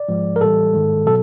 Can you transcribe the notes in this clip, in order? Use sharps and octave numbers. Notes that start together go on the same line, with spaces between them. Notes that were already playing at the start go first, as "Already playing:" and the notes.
Already playing: D5
G#2 F3 G#3
A#4
A2 E3 G3 A4
G#2 D#3 G#3
B2 F#3 A4